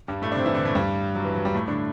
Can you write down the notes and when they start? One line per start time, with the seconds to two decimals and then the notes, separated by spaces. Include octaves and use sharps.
0.08 G2 G3
0.22 A2 A3
0.32 D4
0.35 C3 C4
0.45 E3 E4
0.55 D3 D4
0.65 A2 A3
0.75 G2 G3
1.15 F#3
1.24 E3
1.35 F#3
1.45 G2 G3
1.55 A2 A3
1.68 D3 D4